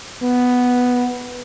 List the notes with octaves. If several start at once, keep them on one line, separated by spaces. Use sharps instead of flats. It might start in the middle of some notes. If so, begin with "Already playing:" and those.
B3